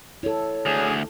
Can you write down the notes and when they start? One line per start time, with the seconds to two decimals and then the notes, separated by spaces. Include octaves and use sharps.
0.23 E4 A4 C#5
0.66 D2 G#4